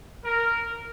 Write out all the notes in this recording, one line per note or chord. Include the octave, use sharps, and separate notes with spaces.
A#4